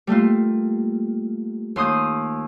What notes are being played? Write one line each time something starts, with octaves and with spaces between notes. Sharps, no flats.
G3 A3 A#3 F4
D#2 C6 D#6 G6